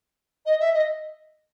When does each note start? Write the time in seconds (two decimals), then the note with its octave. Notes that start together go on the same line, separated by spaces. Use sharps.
0.45 D#5
0.60 E5
0.73 D#5